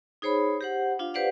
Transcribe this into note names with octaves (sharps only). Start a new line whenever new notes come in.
D#4 G#4 C5 C#5 B5
G4 C5 F#5
D4 F4 F5
G4 B4 C5 D5 F5 F#5